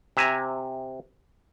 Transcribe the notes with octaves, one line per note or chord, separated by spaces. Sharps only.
C3 E5 G#5 A#5